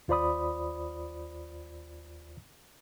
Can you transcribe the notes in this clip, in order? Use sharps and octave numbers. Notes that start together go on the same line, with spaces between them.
D#2 F4 C5 D5 B5 D#6